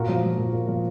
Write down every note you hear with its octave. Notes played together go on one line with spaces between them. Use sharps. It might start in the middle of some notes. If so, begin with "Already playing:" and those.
Already playing: A#2 F#4 A#4
F3
F3
A#2
A#2
F3